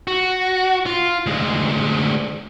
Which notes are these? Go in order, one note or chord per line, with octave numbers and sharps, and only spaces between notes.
F#4
F4
D2 G#3